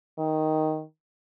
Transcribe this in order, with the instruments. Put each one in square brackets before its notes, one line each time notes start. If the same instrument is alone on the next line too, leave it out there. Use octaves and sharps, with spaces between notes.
[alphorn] D#3